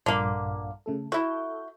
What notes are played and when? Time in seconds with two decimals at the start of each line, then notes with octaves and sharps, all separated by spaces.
0.06 A#1 G2 A#2 D3 A#3
0.86 C#3 A3 A4
1.12 E4 F#4 A4 E5 G6